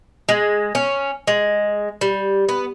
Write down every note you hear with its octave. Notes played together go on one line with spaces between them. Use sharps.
G#3
C#4
G#3
G3
B3